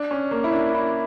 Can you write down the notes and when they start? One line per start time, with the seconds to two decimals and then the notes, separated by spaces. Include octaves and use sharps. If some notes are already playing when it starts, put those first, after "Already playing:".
Already playing: D4
0.11 C#4
0.31 A#3
0.44 E4
0.52 D4
0.74 E4